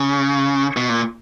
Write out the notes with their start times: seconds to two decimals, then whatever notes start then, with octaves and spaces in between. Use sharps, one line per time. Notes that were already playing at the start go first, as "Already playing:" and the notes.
Already playing: C#3
0.77 B2
0.89 A#2